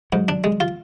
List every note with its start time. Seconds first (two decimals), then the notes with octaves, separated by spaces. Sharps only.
0.13 G#2 F#3
0.28 D4
0.44 G#3
0.60 F4